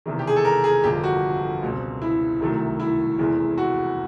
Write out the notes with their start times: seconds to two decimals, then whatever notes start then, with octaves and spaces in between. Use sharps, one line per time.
0.06 E1 E2 C3 D#3
0.19 G4
0.27 G#4
0.36 A4
0.45 A#4
0.64 G#4
0.83 G1 F2 D3 F3 A#3 G4
1.04 F#4
1.62 C#2 B2 G3 C4
2.02 E4
2.40 C2 C3 D#3 F#3 A3
2.80 E4
3.18 F1 E2 C3 E3 G#3
3.58 F#4